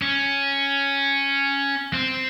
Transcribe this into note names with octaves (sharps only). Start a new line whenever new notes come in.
C#4
C4